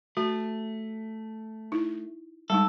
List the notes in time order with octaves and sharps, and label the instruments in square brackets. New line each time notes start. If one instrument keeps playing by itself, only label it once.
[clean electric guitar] A3 [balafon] F#4
[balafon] D#4 E4
[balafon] G3 G#3 D#4 [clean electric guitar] A4